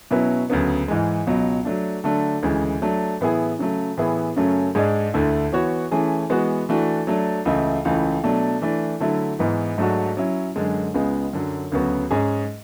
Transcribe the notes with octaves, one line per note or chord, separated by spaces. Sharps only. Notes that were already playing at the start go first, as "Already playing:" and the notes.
B2 F#3 C#4 E4 B4
D2 C#3 F#3 B3
G#2 E3 G#3
C#2 B2 F#3
F#3 A3 D4
D3 F#3 A3 D4
D2 C#3 E3 G#3
F#3 A3 D4
A2 E3 B3 E4 G#4
C#3 F#3 A3
A2 E3 B3 E4 G#4
F#2 C#3 F#3 A3 C#4
G#2 G#3 D4 G#4 D5
D2 D3 A3 E4
E3 B3 F#4 C#5
E3 A3 C#4 G#4
E3 G#3 B3 F#4
E3 A3 D4 F#4
F#3 A3 D4
C#2 C#3 E3 A3 E4
C#2 C#3 E3 A3
B2 F#3 A3 D4
E3 A3 D4
D3 F#3 A3 E4
G#2 E3 B3
G#2 F#3 A3 D4 F#4
F#3 C#4 E4
F#2 D3 G#3
C#2 C#3 G#3 B3
F#2 D3 F#3
D2 C#3 F#3 B3 F#4
G#2 G#3 C#4 G#4